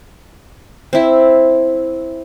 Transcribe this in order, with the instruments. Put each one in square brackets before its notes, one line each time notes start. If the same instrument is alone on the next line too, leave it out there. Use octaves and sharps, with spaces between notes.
[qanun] C4 E4